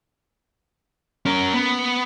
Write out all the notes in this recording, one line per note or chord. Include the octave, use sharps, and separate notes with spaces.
C#4 A#4
B3